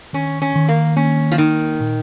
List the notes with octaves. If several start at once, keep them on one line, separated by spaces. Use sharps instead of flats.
D#3 C#4
C#4
D#3
A#3
A#3 C#4
F3
D#3 D#4
A#2